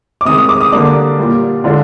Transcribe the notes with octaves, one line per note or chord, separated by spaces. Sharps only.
D6
C3 D#3 G#3 D#6
D#6
D6
D#6
D3 G3 A#3 D4 D6
A#2 G3 A#3
D3 G#3 D4 F4